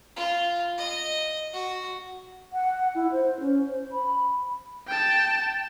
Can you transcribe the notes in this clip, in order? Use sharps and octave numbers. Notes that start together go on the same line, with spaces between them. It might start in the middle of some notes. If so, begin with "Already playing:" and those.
F4
D#5
F#4
F#5
E4
C5
C#4
C5
B5
G5 A5